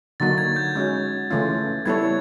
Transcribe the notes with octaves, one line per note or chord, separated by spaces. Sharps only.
D3 F#3 A#3 D#4 F#4 A6
G#6
G6
G#3 C#4 F#4
C#3 E3 A3 C#4 F4
G3 B3 E4 A4 C#5 G#6